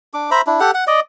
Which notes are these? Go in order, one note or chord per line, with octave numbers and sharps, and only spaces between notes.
D4 D6
C5 E5 A#5 B5
D4 E4
G4 A4 F#5
F#5
D5 D#5